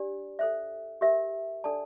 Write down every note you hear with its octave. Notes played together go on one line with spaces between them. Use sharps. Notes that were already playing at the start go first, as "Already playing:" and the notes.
Already playing: D4 G4 D5
A4 C5 E5
G4 A#4 E5
D4 A4 D5 A5